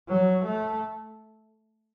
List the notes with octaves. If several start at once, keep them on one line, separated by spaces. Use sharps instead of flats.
F#3
A3